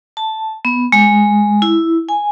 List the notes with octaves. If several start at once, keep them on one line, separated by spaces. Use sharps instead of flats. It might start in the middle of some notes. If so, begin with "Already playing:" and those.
A5
B3
G#3
E4
G#5